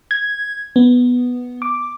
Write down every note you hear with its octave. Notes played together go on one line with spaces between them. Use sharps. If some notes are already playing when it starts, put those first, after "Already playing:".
G#6
B3
D6